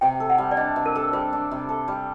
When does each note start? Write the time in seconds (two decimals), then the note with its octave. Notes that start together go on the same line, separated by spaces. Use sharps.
0.01 C3 G5
0.20 A4
0.30 F#5
0.38 G3
0.51 D5
0.57 D4 D#5
0.76 C3
0.86 A#4
0.95 A4
1.13 G3 C5
1.33 D4
1.51 C3
1.69 A4
1.88 G3